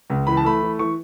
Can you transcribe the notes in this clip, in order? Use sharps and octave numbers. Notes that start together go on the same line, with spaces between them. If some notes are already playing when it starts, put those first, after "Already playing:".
C#2
E3 B5
A5
A3 B5
E3
E3 C#6